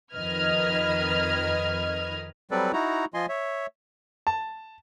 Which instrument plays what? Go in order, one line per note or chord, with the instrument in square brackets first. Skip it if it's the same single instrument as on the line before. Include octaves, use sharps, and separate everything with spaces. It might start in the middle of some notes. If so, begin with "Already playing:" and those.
[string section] F2 D#3 B4 D#5 F6 G#6
[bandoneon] F#3 G3 C4 A4 B4 D5
D#4 E4 F#4 A#5
F3 F4 D#5 G#5 C6
C#5 E5
[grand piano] A5